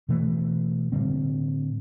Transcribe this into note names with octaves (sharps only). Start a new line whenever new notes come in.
B2 E3 A3
A2 D3 G3 C4